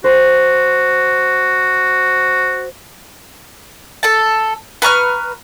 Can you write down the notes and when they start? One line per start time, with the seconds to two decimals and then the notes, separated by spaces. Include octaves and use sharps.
0.04 F#4 C5
4.03 A4 A5
4.82 B4 A#5 C#6 F6